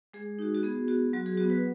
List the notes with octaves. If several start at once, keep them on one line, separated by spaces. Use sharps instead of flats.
G#3 G#4
D#4 F#4
F#4
B3 G#4
F#4
F#3 F#4
G#4
B3 F#4
F#4 B4